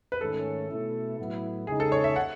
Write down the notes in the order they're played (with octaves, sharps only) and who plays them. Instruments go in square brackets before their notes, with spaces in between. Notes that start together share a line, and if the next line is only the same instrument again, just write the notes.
[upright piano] B4
[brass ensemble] G#2 D#3 A3 C#4 [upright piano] A4
[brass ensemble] B2 A3 E4
A2 F#3 B3 E4
[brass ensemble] C#3 G#3 D#4 [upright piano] G#4
[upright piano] A4
C#5
E5
F#5